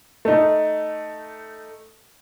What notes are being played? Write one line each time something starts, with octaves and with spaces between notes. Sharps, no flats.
A3 D#4